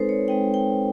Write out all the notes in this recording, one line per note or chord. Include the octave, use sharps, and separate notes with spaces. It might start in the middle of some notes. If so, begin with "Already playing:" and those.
Already playing: G#3 C4 D#4 A4 B4 C5
C#5
G#3 C4 D#4 G5
G5